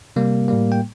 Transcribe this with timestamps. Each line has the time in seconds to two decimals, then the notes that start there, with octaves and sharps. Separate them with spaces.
0.16 C3 G3 A#3
0.48 A2 G3 A#3
0.72 G5